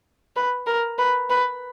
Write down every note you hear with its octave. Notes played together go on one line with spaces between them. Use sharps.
B4
A#4
B4
B4